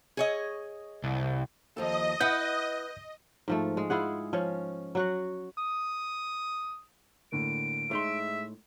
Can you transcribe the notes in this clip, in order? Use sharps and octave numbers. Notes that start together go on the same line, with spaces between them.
G#4 C#5 D#5
C2
D#2 F3 A4 D#5
E4 B4 F#5 G6
G#2 F3 A3
G#3
E4 F4 G#4 F#5
F3 C#4 C#5
F#3 F#4 F#5
D#6
A2 D3 A#3 D7
A2 G#3 D#4 E5 C6